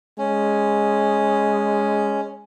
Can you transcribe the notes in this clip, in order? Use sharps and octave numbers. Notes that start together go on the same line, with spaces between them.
G#3 C#4